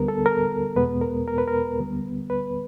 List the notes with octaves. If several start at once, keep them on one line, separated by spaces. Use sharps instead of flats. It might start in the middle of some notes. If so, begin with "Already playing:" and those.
Already playing: D2 D3 G3 B3 A#4
A4
A#4
E2 B2 G#3 B3 B4
A#4
A#4
B4
A#4
D2 D3 G3 B3
B4